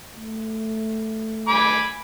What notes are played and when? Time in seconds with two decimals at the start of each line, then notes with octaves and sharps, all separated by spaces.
0.15 A3
1.48 G#5 B5 D6